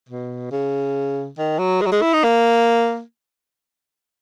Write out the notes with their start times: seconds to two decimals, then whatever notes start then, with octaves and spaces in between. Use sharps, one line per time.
0.09 B2
0.52 C#3
1.38 D#3
1.59 F#3
1.81 G#3
1.86 F#3
1.92 G#3
2.02 E4
2.13 D#4
2.24 A#3